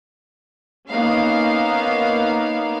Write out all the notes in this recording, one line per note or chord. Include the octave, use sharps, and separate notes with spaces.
A#3 B3 C#4 D#4 F5